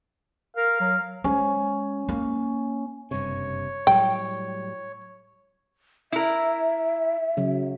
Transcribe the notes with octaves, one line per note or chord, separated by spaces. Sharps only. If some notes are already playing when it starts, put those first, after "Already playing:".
A#4 F5
F#3
G#3 C#4
A#3
F#1 G2 C3 C#5
A2 F#3 G3 G5
E4 A#4 E5
C#3 F#3